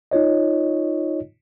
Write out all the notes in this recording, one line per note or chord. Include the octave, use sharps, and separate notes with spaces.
D#4 F4 C#5 D#5